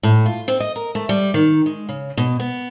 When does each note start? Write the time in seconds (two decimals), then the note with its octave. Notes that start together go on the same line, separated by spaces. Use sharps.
0.03 A2
0.26 F4
0.48 C4
0.60 D#5
0.76 A#4
0.95 A3
1.09 G3
1.34 D#3
1.66 G#3
1.89 C#3
2.17 B2
2.40 B3